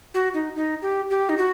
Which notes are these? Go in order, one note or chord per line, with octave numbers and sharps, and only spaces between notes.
F#4
D#4
D#4
G4
G4
D#4
F#4